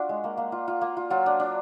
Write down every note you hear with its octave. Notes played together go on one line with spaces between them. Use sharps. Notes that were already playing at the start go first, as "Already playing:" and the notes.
Already playing: D4 F4 F#4
G#3
A#3
A#3
F4
F4
A#3
F4
F#3 F4
D4
D4